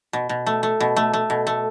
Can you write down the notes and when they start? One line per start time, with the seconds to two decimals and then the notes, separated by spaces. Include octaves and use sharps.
0.13 B2
0.29 B2
0.47 A3
0.63 A3
0.80 B2
0.97 A3
1.13 A3
1.30 B2
1.47 A3